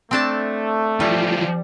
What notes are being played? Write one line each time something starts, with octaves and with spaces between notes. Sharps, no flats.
A3 C4 D4 A5
E3 F3 G3